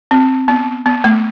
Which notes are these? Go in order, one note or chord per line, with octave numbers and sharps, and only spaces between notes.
C4
B3
B3
A3